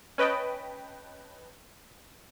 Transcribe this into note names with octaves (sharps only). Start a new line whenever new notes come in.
C#4 B4 D#5 G5 A5